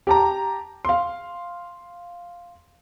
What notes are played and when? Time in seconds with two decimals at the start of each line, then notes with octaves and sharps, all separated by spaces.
0.07 G4 A5 A#5
0.85 F5 C6